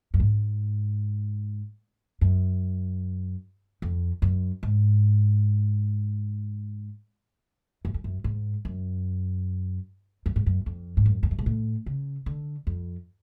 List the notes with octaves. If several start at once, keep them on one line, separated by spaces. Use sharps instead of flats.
F#2
G#2
F#2
F2
F#2
G#2
F#2
F2
F#2
G#2
F#2
F#2
G#2
F#2
F2
G#2
F#2
F2
F#2
G#2
A2
C#3
D3
F2